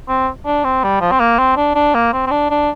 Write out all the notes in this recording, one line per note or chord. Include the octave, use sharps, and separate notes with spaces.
C4
D4
C4
G3
F3
C4
A#3
C4
D4
D4
A#3
C4
C4
D4
D4